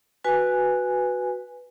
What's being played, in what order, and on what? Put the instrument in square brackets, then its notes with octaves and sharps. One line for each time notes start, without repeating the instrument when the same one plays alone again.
[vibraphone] F#4 B4 G#5